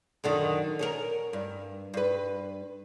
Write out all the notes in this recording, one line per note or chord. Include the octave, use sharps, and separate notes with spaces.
F#2 D3 D#3
C#4 A4 A#4
G2
G2 B4